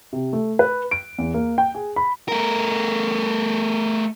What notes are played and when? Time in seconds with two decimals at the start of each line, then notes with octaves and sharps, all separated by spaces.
0.13 C3
0.33 A3
0.59 B4
0.91 D7
1.18 E2
1.34 A#3
1.58 G5
1.75 G#4
1.96 B5
2.28 A3 A#4